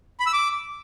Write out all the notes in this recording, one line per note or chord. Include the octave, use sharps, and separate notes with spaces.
B5
E6
D6